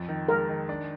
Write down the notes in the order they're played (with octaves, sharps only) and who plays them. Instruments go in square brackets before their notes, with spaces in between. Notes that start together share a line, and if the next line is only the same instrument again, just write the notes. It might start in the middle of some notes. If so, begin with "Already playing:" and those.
Already playing: [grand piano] F2
D#3
[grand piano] G#3 [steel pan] A#4
[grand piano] D#3
D4